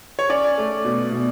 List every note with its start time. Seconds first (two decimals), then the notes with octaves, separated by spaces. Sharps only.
0.19 C#5
0.29 C#4 D5
0.58 A3
0.85 B2
1.12 B2